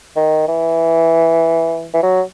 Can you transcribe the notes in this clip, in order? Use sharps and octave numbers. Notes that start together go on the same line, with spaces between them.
D#3
E3
E3
F#3